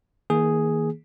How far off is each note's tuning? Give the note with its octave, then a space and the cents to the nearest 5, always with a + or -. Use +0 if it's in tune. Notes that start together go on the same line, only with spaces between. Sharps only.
D#3 +35 A#3 +0 G#4 +0